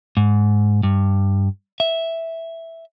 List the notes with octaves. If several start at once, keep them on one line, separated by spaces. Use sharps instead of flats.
G#2
G2
E5